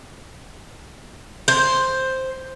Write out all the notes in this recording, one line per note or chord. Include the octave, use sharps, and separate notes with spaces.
C5